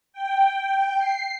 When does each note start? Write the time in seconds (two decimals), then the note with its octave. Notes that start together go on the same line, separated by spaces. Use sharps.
0.13 G5
0.99 C7